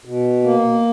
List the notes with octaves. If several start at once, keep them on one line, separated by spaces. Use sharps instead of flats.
B2
A#3